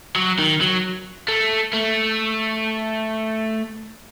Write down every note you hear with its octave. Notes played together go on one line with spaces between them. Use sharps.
F#3
D#3
F#3
A3
A3